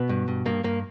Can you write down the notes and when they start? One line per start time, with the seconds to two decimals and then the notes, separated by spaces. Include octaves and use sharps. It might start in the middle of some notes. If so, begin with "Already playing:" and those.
Already playing: B2 B3
0.09 G2
0.28 G2
0.46 G2 A#3
0.64 G2 A#3